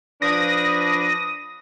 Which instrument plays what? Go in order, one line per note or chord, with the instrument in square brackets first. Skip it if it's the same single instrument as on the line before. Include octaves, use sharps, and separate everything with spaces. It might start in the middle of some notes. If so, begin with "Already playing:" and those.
[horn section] F3 D4 B4 [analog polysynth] D#6 [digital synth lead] A#6